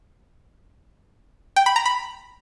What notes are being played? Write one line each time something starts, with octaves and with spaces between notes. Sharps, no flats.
G5
B5
A#5
B5